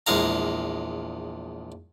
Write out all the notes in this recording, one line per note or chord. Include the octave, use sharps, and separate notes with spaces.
A#1 E2 G#3 F5 A#5